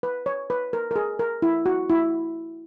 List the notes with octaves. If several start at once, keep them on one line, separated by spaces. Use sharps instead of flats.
B4
C#5
B4
A#4
A#4
G#4
A#4
E4
F#4
E4